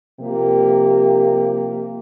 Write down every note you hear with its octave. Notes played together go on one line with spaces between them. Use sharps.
C3 F3 A#3 F4 G4